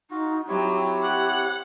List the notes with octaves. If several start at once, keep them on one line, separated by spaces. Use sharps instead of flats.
D#4 F4 F#4
F#3 C4 E4 G4 C#5
F#5